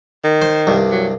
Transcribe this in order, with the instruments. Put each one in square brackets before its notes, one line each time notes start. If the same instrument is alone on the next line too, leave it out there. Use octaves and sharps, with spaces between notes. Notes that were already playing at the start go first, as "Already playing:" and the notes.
[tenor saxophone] D#3
[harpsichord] C5 C6
C2 G2
[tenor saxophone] F#3